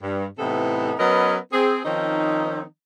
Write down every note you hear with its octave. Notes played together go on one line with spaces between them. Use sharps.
G2
A2 C3 E3 B3 D#4 A4
F#3 B3 C#4 A#4 B4 D#5
C4 G#4
D#3 F3 C4 C#4 D#4